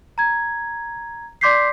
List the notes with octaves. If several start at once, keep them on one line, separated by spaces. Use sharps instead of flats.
A#5 G#6
D5 C6 D6 G6 B6 C7